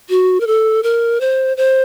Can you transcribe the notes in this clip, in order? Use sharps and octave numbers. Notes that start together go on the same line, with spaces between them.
F#4
A#4
A4
A#4
C5
C5